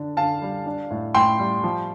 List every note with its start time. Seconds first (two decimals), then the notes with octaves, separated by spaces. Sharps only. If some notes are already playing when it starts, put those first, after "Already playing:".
Already playing: D3 D4
0.17 D3 F5 A5
0.42 G3
0.66 D4
0.91 A2
1.14 A2 G5 C6
1.39 G3
1.64 F3